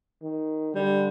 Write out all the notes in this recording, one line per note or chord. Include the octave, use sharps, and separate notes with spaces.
D#3
D3 G3